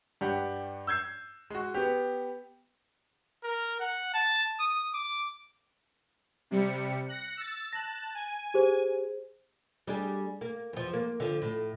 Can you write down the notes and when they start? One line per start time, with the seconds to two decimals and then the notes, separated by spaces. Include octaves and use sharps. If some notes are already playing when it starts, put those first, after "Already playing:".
0.21 G2 D4 G4 F#5
0.87 E6 G6 G#6 C7
1.50 G#3 F#4
1.74 B3 G4
3.44 A#4
3.80 F#5
4.14 A5
4.59 D#6
4.94 D6
6.51 C3 G3 C#7
7.08 F#6 A#6 C#7
7.37 E6 A6
7.73 A5 F#6 A#6
8.15 G#5
8.54 G4 G#4 C5
9.87 G3 D4 G#4
10.41 A#3
10.73 E2 F3
10.93 A#3
11.20 D3 F3
11.42 A2